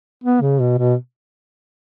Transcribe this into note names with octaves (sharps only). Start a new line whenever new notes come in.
B3
C#3
B2
B2